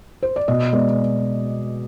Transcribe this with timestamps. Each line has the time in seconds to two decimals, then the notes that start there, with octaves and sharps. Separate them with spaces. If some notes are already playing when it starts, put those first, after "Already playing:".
0.23 C5
0.36 D5
0.48 B2 D#5
0.73 G#3 B3 D5